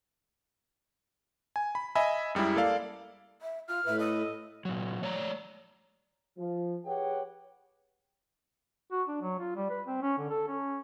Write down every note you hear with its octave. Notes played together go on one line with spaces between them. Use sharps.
G#5
B5
D#5 E5 G#5 B5
F#2 G3 G#3 E4
A#3 A4 D5 F5
E5
F4 F6
A2 B4 E5
A4 D#5
A#2 F#3
A3 C#5 D5 G#5 A#5
F3
G4 G#4 B4 C#5 F#5 G5
F#4
D4
F#3
F4
G3
B4
C4
C#4
D3
A4
C#4